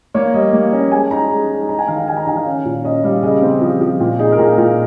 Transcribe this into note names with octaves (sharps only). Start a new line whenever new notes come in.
A#3 C#5
G3 D#5
A#3
C#4
G#3 G#5
D#4 A#5
G#3
D#4
D#4 A#5
G#5
D#3 F5
G5
D#4 G#5
A#5
D#3 G#5
F5
C#4
A#2
C#4 D#5
G3 F5
C#3 D#5
C4
F3
F3
A#2
D#4 G#4
A#4
A#2 G#4
A#2